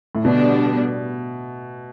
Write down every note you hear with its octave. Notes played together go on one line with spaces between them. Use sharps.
A2
B2 D3 G3 B3 D4